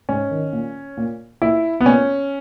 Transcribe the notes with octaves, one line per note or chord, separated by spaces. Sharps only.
G#2 C#4
D#3
A#2
A#2
A#2 E4
B3
A#2 C#4